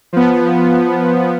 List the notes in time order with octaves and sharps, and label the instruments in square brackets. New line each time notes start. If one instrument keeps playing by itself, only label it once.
[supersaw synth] F3 B3